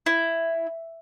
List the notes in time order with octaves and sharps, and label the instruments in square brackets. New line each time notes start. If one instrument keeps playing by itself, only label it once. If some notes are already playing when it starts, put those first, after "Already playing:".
[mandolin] E4